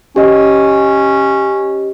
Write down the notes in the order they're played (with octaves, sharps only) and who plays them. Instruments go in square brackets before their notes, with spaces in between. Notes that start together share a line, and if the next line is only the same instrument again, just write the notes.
[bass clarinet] C#4 [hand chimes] G4 D#5